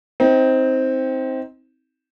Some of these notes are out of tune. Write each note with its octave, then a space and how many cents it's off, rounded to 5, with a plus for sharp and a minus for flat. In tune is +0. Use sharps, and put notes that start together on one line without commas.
C4 +0 D#4 +30